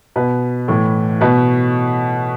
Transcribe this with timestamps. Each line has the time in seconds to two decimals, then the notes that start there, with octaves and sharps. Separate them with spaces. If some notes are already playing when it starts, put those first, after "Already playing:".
0.16 B2 B4
0.68 A2 E3
1.21 B2 B4